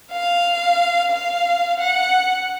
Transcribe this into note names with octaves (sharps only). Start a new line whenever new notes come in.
F5
F5
F#5